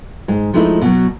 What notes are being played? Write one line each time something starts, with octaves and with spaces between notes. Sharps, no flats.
G#2 G#3
F3 G#3 A3 D#4 E4
B2 F#3